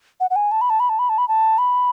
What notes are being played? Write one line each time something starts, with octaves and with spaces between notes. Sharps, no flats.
F#5
F#5
G#5
A5
B5
A5
B5
A5
B5
A5
B5
A5
B5